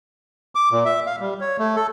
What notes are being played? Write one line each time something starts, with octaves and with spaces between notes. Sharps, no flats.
D6
A#2
E5
F5
G3
C#5
A3
A4